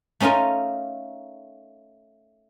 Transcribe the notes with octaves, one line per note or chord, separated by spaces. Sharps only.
A3 C#4 D#4 F4 A#4